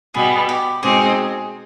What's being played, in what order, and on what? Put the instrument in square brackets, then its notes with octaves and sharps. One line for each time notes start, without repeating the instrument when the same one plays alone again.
[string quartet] B2 G3 B3 [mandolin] G#4
[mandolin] G4
[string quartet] B2 G#3 C4 D#4 [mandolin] G#4